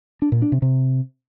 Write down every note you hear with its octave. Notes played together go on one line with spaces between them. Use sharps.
D4
A#2
D4
C3
C3